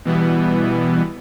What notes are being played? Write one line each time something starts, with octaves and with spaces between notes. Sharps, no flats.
B2 E3 G3 B3